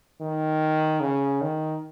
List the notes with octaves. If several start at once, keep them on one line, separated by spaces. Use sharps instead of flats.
D#3
C#3
D#3